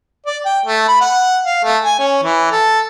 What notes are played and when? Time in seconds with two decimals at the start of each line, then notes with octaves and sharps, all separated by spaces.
0.26 D5
0.45 G5
0.66 A3
0.88 B5
1.01 F#5
1.46 F5
1.64 A3
1.84 G#5
1.99 C#4
2.24 E3
2.51 A4